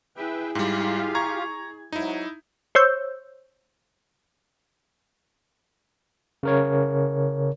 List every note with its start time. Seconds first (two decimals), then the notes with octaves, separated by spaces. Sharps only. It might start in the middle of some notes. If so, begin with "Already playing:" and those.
0.17 E4 G#4 B4 E5 G5
0.55 G#2 G3 F4 G4 F5
1.15 A#5 C#6 G#6
1.92 G#2 F#3 D#4 E4
2.75 C5 C#5 E6 G6
6.43 C#3 A#4 C#5